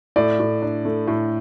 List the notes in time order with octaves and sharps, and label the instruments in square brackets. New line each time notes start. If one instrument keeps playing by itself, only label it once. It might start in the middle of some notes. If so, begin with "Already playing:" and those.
[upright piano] A2 D5
A2
D4
A3
A2